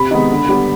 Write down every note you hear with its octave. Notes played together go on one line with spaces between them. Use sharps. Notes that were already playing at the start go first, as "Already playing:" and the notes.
Already playing: C3 B5
D#3 G#3 B3
D3
G3 B3